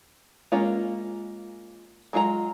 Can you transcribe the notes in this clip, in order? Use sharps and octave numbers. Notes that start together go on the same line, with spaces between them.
G#3 A#3 C#4 F4
F#3 G#3 F4 A#4 A#5